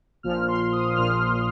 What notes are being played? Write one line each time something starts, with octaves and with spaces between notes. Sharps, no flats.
A#1 A#2 F3 F6
C6
D#6
A#1 A#2 F3 F6